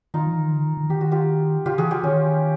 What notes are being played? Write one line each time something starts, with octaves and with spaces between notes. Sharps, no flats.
D#3 D#4 F4
E3
D#3
D3
D#3
D#3
D#3 G4
F#4
F4 G4
C#3 F4 G4
E3 F#4 G#4
F4 G4
D#3 C#4